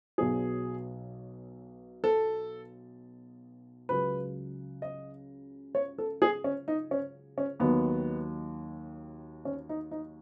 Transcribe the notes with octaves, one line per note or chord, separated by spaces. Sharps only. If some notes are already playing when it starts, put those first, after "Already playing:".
B1 B2 F#3 G#4
A4
C#2 C#3 F#3 B4
D#5
C#5
A4
G#4
C#4
D#4
C#4
C#4
D#2 D#3 F#3 B3
C#4
D#4
D#4